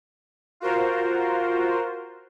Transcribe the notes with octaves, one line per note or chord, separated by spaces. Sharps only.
F4 F#4 A#4 C5